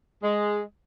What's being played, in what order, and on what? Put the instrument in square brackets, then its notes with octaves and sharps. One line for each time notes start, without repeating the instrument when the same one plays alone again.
[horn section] G#3